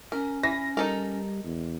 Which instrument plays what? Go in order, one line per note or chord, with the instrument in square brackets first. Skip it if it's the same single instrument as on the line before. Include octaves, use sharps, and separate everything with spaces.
[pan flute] C#4 [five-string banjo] A#4
[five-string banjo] E3 [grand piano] A#6
[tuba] G3 [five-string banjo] D#4 A4 A#4
[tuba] E2